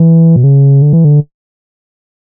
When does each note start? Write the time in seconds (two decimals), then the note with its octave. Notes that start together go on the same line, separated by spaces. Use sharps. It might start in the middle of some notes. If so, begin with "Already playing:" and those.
Already playing: E3
0.36 B2
0.44 C#3
0.82 D3
0.93 E3
1.05 D3